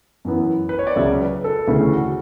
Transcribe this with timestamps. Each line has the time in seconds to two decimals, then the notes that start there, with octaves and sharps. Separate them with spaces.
0.25 F#2 E3 B3
0.69 B4
0.79 C#5
0.87 D5
0.96 C#2 C#3 F#3 E5
1.21 B4
1.44 A4
1.68 D2 C#3 E3 A3
1.92 F#4